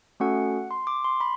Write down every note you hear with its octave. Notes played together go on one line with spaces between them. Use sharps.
A3 C#4 F#4 A4 F#5
C6
D6
C6
B5